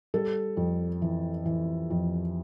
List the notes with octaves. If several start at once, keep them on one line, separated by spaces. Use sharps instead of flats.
G3 A4
F2
E3
E3
F2